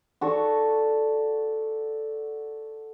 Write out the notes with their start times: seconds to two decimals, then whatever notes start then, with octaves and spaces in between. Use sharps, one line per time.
0.21 F#4 A4 D5 C#6